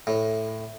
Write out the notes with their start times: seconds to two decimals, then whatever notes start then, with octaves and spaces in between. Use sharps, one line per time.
0.07 A2